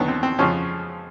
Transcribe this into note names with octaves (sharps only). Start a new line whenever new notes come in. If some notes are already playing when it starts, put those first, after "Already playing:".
Already playing: D#2 D3 F#3 B3
C4
C4
F2 C#3 F3 C#4